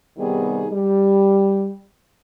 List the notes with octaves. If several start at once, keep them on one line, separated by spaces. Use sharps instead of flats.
C3 D#3 G3 B3 D#4 G#4
G3